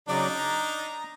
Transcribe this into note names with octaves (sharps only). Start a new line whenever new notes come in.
C#3 F#3 D4 D#4 D5
A#5